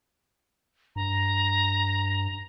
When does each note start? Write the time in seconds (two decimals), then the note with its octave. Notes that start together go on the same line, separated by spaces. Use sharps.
0.96 G2 A#5